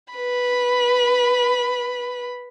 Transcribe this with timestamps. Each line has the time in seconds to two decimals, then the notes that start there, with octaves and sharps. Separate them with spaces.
0.14 B4 B5